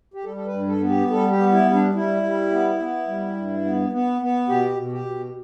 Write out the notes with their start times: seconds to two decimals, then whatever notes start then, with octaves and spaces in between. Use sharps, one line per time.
0.14 G4
0.24 G3 A4
0.36 A4
0.46 B4
0.53 G2
0.67 A4
0.81 B3
0.89 G4
1.10 G3 A4
1.31 G4
1.37 B3
1.52 E4
1.66 G3
1.73 D4
1.94 G3 E4
2.23 G3
2.52 B3
2.79 B3
3.07 G3
3.37 G2
3.65 B3
3.92 B3
4.22 B3
4.49 B2 G4
4.77 B2
4.92 G4
5.06 B2